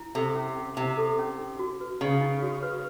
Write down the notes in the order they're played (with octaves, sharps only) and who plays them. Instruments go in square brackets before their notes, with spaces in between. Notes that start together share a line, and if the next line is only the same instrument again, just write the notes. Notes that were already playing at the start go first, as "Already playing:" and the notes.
Already playing: [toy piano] E4
[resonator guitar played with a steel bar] C3 [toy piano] A4
[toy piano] C#4
C#4
[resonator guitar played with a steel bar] C3 [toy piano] E4
[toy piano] A4
C#4
D#4
F#4
B4
[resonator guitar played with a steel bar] C#3 [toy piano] D#4
[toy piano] D#4
F#4
B4